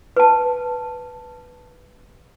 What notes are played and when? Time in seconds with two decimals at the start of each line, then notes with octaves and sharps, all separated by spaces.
0.16 B4 A5